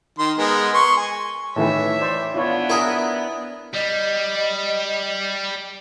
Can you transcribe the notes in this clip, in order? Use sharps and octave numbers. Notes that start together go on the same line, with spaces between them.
D#3 C6
G#3 B3 A#4
C6 C#6
G#5
A2 D#3 E3 C#5 E5
C5 D5
B3 D4 E4 F4 C#5
E4 G#4 A#4
G3 D#5